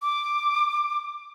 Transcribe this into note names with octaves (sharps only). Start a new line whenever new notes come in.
D6